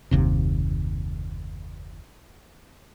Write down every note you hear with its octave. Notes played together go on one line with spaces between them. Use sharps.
F#1 D#2 C3